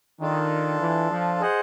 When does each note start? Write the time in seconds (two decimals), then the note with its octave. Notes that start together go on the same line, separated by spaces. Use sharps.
0.20 D#3 D4 F4 A4
0.81 E3
1.10 F3
1.41 G#4 C5 D#5 F#5